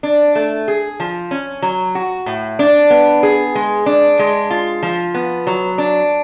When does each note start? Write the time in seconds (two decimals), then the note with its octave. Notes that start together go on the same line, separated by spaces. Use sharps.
0.03 D4
0.35 A3
0.68 G#4
1.00 F3
1.31 C#4
1.62 F#3
1.95 F#4
2.26 A2
2.59 D4
2.90 B3
3.23 G#4
3.55 G#3
3.86 D4
4.19 G#3
4.50 F4
4.83 F3
5.15 B3
5.47 F#3
5.78 D4